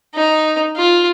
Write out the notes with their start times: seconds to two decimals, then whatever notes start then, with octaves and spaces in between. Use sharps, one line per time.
0.15 D#4
0.76 F4